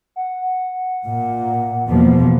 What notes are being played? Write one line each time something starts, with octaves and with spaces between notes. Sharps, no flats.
F#5
A#2
E2 B2 F3 A#3 B3